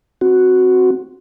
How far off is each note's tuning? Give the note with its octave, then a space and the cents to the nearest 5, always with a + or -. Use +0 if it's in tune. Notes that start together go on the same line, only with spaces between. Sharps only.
C4 +0 F#4 +0